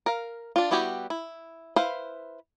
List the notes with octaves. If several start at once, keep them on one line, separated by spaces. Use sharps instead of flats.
A#4 F5
D4 F4
G3 B3 E4 F#4 G4
E4
E4 B4 C5 F5